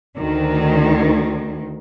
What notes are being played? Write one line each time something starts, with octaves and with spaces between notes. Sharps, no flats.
D2 D#3